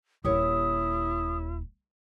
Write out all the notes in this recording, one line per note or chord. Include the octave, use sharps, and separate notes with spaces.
D#1 A#3 E4 G4 A#4 C#5 D#6